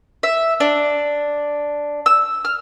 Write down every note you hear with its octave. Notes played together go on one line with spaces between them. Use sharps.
E5
D4
E6
F6